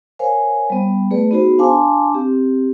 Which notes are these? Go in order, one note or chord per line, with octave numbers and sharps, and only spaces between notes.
A#4 C5 C#5 F5 G#5
G3 B3
A3 G#4 B4 D5
B3 D#4 F#4 G#4 C5
D4 F5 G#5 A5 C6 D6
C4 G4